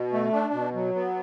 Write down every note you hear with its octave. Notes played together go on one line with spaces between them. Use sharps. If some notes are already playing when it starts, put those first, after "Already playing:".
Already playing: B2
A3
D4
B2
F#3
B3